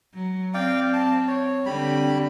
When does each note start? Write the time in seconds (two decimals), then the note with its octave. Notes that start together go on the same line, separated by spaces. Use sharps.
0.14 F#3
0.54 C4 D5 F5 G5
0.93 A5
1.28 C#5
1.66 D3 G3 C4 B5